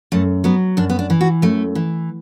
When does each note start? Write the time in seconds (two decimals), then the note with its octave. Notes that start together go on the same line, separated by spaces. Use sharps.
0.12 F#2 A3
0.44 F#3 B3
0.77 F#2 D4
0.90 B3
0.99 D4
1.10 E3
1.21 F#4
1.42 F#2 A3
1.75 E3